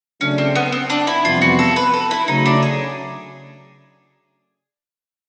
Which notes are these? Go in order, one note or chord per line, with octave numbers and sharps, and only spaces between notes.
C#3 F#3 A3 C#4 D4
C4
B3
C4
D4
E4
F2 C3 E3 G3 B3 F4
F#4
A4
B4
A4
E4
C#3 F#3 A3 D#4
D4
G#4